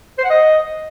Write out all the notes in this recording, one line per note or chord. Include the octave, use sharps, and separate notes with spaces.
C5
F#5
D#5